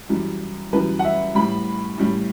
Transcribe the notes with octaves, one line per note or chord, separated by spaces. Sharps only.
F#2 E3 G3
F#2 E3 G3 B4
F#5
E5
A2 G3 B5
A2 G3